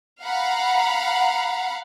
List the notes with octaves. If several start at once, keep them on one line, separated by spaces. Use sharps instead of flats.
F5 F#5 A#5 B5